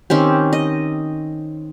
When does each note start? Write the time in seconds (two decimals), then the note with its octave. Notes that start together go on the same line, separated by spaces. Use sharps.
0.10 D#3 C4 C#4 G4
0.53 D#5